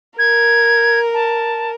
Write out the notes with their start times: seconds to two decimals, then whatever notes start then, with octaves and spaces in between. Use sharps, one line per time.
0.19 A#4 G#6
1.14 A5